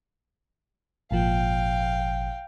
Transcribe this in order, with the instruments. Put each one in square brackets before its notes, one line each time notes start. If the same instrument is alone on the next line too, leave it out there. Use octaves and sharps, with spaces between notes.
[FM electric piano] G#1 A#2 F3 [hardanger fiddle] F5 G5